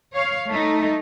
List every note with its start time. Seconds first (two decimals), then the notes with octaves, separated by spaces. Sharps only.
0.13 C#5 F5
0.49 A3 D#4